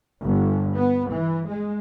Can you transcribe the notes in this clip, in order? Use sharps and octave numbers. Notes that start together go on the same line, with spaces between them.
G1
B3
E3
G#3